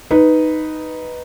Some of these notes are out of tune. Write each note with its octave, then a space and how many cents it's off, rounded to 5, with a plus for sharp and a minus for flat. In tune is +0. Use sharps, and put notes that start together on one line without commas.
D#4 +0 B4 +0